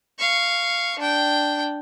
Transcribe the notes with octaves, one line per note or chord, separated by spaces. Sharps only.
F5 C#6
D4 G5